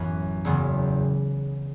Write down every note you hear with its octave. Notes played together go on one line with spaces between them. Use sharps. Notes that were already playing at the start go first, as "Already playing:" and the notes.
Already playing: A1 F#2 E3 B3
F#1 E2 C#3 F#3 B3